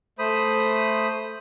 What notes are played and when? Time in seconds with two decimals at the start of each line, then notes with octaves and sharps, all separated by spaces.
0.19 A3 C5 B5 D#6